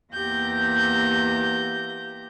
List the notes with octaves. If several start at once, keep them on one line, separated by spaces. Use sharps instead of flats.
E2 A#3 G4 G6 A#6